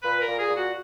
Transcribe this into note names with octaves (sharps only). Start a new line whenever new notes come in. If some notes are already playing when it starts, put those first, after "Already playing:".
A#2 B4
A#4
A#2
G#4
A#2
F#4